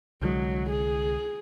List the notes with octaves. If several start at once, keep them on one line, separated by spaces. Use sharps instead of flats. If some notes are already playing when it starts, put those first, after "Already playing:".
C2 D3 F#3 G#3
G#4